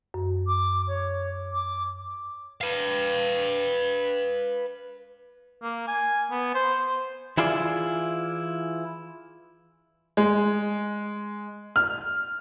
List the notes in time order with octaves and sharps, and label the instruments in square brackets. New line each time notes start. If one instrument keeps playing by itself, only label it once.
[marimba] F#2
[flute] D6
C#5
D6
[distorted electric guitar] B4 F5
[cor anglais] A#3
G#5
B3
C5
[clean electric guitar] E3 E4 F4 G#4 D5
[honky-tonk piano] G#3
F6